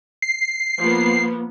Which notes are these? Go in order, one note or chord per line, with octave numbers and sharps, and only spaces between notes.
C7
F3 A#3 B3